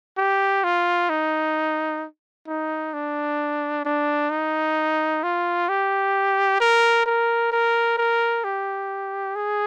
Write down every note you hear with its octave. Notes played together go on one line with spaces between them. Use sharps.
G4
F4
D#4
D#4
D4
D4
D#4
F4
G4
A#4
A#4
A#4
A#4
G4
G#4